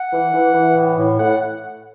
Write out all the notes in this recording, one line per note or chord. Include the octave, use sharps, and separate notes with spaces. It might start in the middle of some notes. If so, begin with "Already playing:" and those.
Already playing: F#5
E3
E3
E3
A2
A2
A2 F#5
F#5